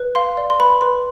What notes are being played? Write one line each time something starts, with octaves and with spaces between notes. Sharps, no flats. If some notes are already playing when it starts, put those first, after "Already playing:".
Already playing: B4
F5 C6
D5
C6
B4 B5
B4 C6